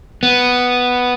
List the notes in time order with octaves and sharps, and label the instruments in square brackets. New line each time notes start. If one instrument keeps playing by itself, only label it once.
[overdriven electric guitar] B3